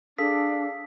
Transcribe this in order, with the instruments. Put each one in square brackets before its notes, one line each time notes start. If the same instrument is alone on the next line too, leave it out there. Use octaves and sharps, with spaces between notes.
[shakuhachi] D4 [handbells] G#4 A4 F5 [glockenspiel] B6